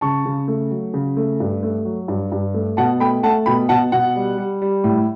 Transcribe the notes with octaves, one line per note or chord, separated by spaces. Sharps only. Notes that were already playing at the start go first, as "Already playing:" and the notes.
C#3 A5 C#6
C#3
A3
F#3
C#3
A3
G2
A3
F#3
G2
G2
A3
B2 F#5 A5
A3 G5 B5
A3 F#5 A5
B2 G5 B5
B2 F#5 A5
B2 F#5
G3
G3
G3
A2